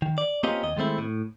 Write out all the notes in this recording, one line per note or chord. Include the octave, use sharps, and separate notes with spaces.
D#3
D5
A#3 C4 C#4 F4 G4 D#5
D#2 D#5
D#3 G#3 A3 C4 E4
A2